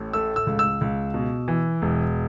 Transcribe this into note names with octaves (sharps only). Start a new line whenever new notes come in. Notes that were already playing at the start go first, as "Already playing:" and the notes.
Already playing: A1 A2
A3 E6
E6
C#2
E6
C#2
B2
E3
E1